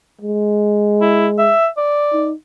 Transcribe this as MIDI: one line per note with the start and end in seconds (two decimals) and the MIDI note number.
0.21 1.53 56
1.01 1.27 64
1.39 1.67 76
1.77 2.27 74
2.13 2.33 63